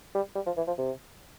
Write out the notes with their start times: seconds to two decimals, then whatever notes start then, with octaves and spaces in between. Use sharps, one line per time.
0.15 G3
0.35 G3
0.46 F3
0.57 E3
0.67 F3
0.78 C3